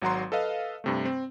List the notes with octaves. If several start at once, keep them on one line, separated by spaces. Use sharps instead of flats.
G#1 F#3 F#5 A#5 C6
A4 B4 D#5 F5
G2 C3 A3
C4